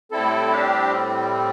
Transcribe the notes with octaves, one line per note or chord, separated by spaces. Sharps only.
A2 G3 C4 E4 A4
D4 G4